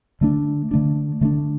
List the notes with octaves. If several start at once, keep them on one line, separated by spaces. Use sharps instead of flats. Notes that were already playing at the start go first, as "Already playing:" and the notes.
D3 A3 D4
D3 A3 D4
D3 A3 D4